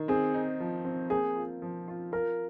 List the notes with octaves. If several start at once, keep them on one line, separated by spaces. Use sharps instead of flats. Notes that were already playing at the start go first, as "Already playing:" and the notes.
Already playing: D#3
C4 G#4
D#4
F3
C4
A#3 G#4
F4
F3
F4
F4 A#4